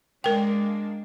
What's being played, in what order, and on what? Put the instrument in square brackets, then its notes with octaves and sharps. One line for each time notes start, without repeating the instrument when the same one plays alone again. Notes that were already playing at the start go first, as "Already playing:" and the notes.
[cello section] G#3 A#3 D4 [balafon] A#4 G5